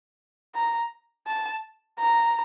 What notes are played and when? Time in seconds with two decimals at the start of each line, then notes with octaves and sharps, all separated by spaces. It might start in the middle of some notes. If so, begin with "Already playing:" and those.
0.55 A#5
1.27 A5
1.99 A#5